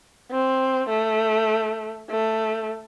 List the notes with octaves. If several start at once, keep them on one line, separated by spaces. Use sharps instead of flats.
C4
A3
A3